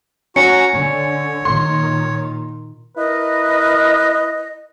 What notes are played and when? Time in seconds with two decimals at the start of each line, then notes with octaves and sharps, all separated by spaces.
0.36 C#4 F#4 G#5 A#5 C#7
0.74 D3 C#5
1.45 A#2 D#3 C6
2.97 E4 A#4 B4 D#5